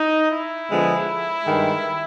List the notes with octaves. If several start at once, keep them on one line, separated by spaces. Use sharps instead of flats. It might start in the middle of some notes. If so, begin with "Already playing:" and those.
Already playing: D#4
E4
D3 F3 G#3 B3
G2 D#3 G#3